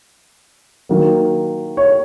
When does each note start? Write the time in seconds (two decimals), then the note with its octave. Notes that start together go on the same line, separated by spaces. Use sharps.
0.89 D#3 F#3 A#3
1.77 C#5